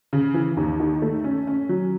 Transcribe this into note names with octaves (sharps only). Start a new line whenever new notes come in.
C#3
E3
D#2
D#3
A3
C#4
C#4
F#3